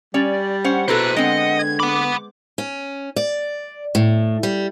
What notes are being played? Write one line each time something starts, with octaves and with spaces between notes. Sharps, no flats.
G3 C#4 D5
C#4 C5 F#5
B2 E4 F4 A4 C5 A#5 F#6
D3 G#3 B3 C4 D#5 F#5
G#6
F#5 B5 D6
C#4
D5
A2
G3